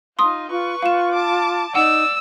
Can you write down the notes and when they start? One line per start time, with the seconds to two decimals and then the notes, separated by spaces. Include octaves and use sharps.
0.19 D#4 F4 C6 D#6
0.50 F4 B4 C#6
0.82 F4 F5 E7
1.13 A5 D6
1.75 D#4 D5 F#5 E6